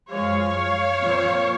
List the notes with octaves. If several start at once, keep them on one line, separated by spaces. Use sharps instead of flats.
F#2 F3 G#3 C#5 F5
A#2 F3 C4